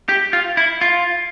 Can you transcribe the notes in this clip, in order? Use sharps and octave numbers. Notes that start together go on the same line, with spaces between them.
G4
F4
E4
F4